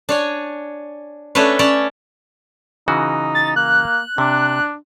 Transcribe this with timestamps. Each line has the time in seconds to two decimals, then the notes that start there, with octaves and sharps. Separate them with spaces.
0.09 D4 C#5 G#5
1.35 A3 C#4 D4 A4 B4 C#5
1.59 C#4 C#5 D5 A5
2.88 C#3 E3 D#4 F#4
3.35 A6
3.56 A#3 F#6
4.18 C3 D4